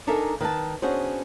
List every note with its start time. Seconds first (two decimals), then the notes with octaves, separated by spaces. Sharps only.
0.07 D4 D#4 A4 A#4 E5 G#5
0.40 D#3 B4 E5 A5
0.82 B3 C#4 D4 F#4 G#4 C5